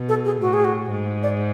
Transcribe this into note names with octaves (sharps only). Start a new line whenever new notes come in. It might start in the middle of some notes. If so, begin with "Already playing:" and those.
Already playing: B2
A4
G#4
A2 F#4
G#4
F#4
G#2
D5